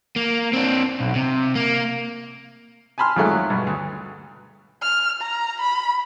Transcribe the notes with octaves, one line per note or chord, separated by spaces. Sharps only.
A#3
C4 D4
B1
C3
A#3
G#5 A5 B5 C6 F6
F2 G#2 F#3 G#3 A3
F#3
G2 B2
D2
F6
A#5
B5